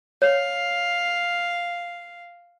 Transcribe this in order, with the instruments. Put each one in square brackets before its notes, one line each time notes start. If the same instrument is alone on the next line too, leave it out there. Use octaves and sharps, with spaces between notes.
[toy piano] C#5 [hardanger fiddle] F5